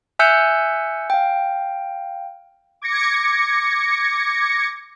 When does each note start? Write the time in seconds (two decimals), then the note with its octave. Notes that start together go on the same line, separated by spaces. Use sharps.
0.19 E5 G#5 E6 F#6 G6 C#7
1.10 F5 G5
2.82 D6 G#6 A#6 C#7